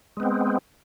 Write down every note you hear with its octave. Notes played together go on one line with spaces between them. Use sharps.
G#3 B3 C4